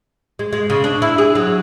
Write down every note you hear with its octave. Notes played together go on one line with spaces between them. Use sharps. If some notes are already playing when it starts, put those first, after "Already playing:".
G#3
G#3
C#3
D4
E4
G#4
F#3